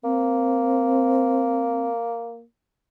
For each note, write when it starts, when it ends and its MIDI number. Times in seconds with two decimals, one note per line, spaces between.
0.04 2.44 58
0.04 1.89 60